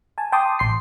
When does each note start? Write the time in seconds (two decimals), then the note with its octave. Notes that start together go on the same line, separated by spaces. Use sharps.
0.18 G#5 A5
0.32 G5 A5 C6 D6 D#6
0.59 A1 C6 C7